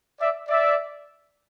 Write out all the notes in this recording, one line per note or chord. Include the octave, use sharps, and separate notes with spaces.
D5 E5
D5 E5